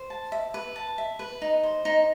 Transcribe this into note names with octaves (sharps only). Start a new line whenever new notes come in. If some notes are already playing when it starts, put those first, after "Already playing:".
Already playing: C5
A5
E5
B4
A5
E5
B4
D#4
C5
D#4